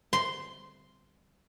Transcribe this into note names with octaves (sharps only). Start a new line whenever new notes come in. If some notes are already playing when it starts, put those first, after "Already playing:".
C6